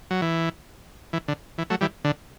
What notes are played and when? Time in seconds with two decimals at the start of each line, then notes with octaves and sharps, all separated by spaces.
0.11 F#3
0.22 E3
1.13 E3
1.28 D3
1.58 E3
1.70 F#3 A3
1.81 E3 G3
2.05 D3